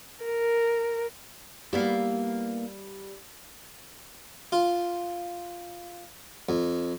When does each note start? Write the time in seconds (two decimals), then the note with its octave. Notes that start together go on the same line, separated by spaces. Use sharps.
0.24 A#4
1.73 G3 A#3 B3 E4
4.52 F4
6.49 F2